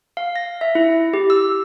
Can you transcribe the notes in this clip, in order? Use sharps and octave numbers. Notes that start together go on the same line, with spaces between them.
F5
A#6
E5
E4
G4
E6